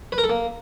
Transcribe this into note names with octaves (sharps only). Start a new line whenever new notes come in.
B4
A#4
A4
A#3